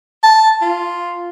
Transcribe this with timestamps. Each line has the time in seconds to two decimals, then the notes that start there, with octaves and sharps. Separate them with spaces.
0.24 A5
0.62 F4